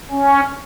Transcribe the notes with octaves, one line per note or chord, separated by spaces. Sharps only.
C#4